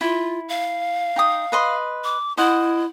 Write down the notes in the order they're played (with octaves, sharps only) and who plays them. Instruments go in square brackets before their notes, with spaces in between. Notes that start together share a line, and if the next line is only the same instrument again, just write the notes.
[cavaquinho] E4 [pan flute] F4
[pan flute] F5
[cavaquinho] D#4 G5 D#6
B4 D#5 C6
[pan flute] D6
[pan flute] E4 [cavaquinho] C5 D#5 F#5